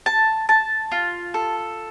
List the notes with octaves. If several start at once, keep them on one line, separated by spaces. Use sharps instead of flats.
A5
A5
F4
A4